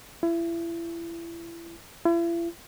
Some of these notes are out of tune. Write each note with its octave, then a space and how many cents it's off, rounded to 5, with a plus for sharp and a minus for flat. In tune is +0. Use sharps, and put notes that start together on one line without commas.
E4 +30
E4 +40